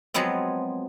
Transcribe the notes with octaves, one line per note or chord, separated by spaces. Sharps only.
F3 F#3 G#3 B3 C4